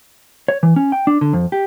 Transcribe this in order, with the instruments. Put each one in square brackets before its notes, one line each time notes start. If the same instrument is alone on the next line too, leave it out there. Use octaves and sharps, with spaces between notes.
[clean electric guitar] C#5
E3
C#4
G5
D4
D3
F2
G4